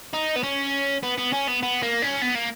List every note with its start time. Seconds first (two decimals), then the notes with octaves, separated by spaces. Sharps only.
0.13 D#4
0.36 B3
0.43 C#4
1.03 B3
1.18 B3
1.33 C#4
1.47 B3
1.63 B3
1.82 A#3
2.02 C#4
2.22 B3
2.35 A#3